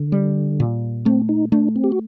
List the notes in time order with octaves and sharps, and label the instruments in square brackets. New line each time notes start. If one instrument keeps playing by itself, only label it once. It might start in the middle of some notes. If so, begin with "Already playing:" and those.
Already playing: [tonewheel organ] D3
[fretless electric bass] G3
A#2
[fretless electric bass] A3 [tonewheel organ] C4
[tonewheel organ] D#4
[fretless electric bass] A3 [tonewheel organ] D4
[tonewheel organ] C4
G4
F#4